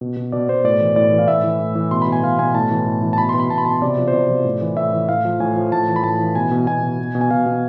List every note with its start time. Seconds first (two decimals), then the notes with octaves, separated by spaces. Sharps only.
0.01 B2
0.17 B2
0.32 B2 D5
0.49 B2 C5
0.64 A2 D5
0.80 E3
0.96 A2 D5
1.12 E3
1.19 F5
1.28 A2 E5
1.44 E3
1.60 A2
1.75 E3
1.91 B2 C6
2.02 B5
2.07 B2
2.12 G#5
2.23 B2 F5
2.39 B2 G#5
2.54 A2 A5
2.71 E3
2.86 A2
3.02 E3
3.13 A5
3.18 B2 B5
3.29 B2 C6
3.40 B5
3.50 B2 A5
3.58 B5
3.65 B2 A5
3.82 C3 D5
3.98 F3
4.08 C5
4.13 C3 D5
4.30 F3
4.45 A2
4.61 E3
4.77 A2 E5
4.93 E3
5.09 A2 F5
5.25 F3
5.40 A2 G#5
5.56 F3
5.72 A2 A5
5.88 E3
5.96 B5
6.04 A2 A5
6.19 E3
6.35 B2 G#5
6.51 B2
6.67 B2 G#5
6.83 B2
6.99 B2
7.15 B2
7.21 G#5
7.31 B2 F5
7.46 B2